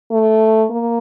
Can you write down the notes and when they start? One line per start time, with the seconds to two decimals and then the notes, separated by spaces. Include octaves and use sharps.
0.11 A3
0.70 A#3